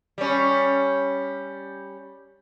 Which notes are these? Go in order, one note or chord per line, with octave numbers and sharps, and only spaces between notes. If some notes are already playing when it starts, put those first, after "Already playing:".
G3 C#4